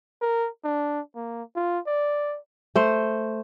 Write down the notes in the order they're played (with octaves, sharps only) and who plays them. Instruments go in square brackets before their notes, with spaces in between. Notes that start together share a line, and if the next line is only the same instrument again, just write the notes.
[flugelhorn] A#4
D4
A#3
F4
D5
[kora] A3 C5